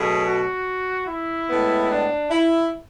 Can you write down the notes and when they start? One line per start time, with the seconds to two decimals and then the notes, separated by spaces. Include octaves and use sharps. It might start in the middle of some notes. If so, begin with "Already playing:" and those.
Already playing: B2 F#3 A3 C#4 G#4
0.25 F#4
1.07 E4
1.48 A2 G#3 B3
1.90 D4
2.30 E4